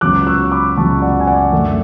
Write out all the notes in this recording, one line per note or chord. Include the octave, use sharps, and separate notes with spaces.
C#2 C#3 F#3 B3 D6 F#6
C#6 E6
B5 D6
C#2 C#3 F#3 B3 A5 C#6
D5 F#5
G#5
D5 F#5
F#2 D3 A3